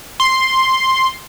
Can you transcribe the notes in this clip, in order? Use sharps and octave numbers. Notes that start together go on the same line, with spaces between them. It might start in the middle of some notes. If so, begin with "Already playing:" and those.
C6